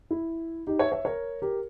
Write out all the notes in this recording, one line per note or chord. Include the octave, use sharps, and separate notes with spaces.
E4
D#4 G4
C#5 E5
C#5 E5
A#4 C#5
G4 A#4